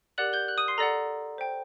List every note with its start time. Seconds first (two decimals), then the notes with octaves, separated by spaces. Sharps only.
0.18 G4 A#4 D5 F#5 F#6 F#7
0.33 G6 G7
0.48 F#6 F#7
0.58 D#6 D#7
0.68 C6 C7
0.78 A4 D5 F#5 A#5 A#6
1.38 C5 G5